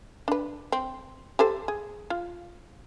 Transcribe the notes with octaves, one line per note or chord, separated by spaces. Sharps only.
D4 B4
C4
G4 A4 C5
G#4
F4